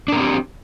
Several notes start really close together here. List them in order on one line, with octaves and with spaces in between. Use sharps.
D4 A#4 C4 G4